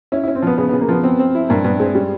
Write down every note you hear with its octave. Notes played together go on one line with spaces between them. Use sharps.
C#4 E4
E4
C#4
C4
F3 B3
C#3 B3
B3
C#3
A#3
F3 B3
B3 C4
C4
E4
G2 A#3
G2 B3
G#3 C4
G3 C#4